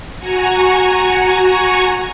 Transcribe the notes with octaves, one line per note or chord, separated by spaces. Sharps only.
F#4 G#5 A#5 C#6